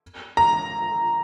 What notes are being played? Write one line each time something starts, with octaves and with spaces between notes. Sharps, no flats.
A#5